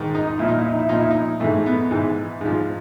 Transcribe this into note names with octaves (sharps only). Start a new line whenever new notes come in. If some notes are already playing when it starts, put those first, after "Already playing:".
Already playing: G#2 D#3
D#4
D#4
A#2 F3 E4
D#4
E4
D#4
E4
A#2 F3 D#4
E4
D#4
G#2 E3 A3
B3
G#2 E3
G#2 F3